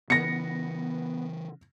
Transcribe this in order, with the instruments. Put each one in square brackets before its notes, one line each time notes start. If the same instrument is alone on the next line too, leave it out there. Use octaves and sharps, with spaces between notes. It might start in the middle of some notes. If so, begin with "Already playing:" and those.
[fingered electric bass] C#3 E3 [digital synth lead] B3 [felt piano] A#6 C#7